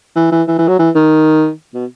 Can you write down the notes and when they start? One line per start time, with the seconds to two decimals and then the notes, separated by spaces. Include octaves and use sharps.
0.16 E3
0.32 E3
0.48 E3
0.58 E3
0.68 F#3
0.79 E3
0.95 D#3
1.74 B2